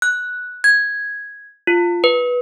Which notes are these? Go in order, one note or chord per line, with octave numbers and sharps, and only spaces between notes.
F#6
G#6
F4
B4